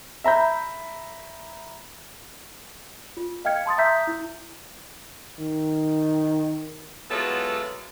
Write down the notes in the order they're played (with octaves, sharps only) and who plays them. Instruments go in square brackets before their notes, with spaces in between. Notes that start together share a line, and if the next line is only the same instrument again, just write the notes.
[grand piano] E5 A#5 B5 G6
[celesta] F4
D#5 F5 G5 F6 G#6 C#7
A5 C6 D#6 A6
E5 A#5 D#6 E6 G6 B6
E4
[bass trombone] D#3
[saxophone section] F#3 G#3 B3 E4 F4 A4